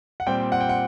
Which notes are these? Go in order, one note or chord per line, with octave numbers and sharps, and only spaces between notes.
F#5
A#2 G3 C4 G5
F#5
G5
F#5